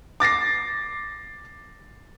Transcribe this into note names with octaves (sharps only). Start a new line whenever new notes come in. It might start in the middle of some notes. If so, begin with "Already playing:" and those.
D6 A6 A#6 C7